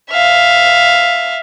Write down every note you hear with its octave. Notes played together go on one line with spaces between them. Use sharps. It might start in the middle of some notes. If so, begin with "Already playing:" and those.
E5 F5